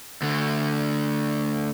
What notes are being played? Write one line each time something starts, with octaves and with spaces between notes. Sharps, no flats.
D2 D3